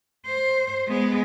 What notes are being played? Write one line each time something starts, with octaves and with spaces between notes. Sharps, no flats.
C5
G#3 B3